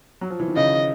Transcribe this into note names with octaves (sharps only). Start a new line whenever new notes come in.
F#3
F3
E3
D#3
C#3 D#5